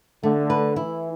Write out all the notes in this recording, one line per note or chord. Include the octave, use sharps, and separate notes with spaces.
D3 A3
B4
E3 E4